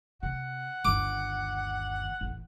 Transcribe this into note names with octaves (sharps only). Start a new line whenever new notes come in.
C3 F#5
G1 D#2 D6
A1 E2